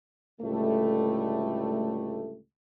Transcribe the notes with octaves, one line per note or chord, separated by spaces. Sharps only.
C#2 A2 D3 G3 A3